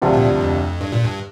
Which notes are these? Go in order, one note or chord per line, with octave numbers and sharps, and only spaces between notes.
D2 G2 C3 F3 D4 G4
A#2
G2
F2
G2
A#2
G2